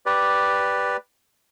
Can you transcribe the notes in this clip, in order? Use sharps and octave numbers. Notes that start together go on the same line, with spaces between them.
G4 B4 D5